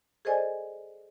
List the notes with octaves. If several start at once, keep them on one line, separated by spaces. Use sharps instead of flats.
G#4 A4 C5 D5 D#5 G#5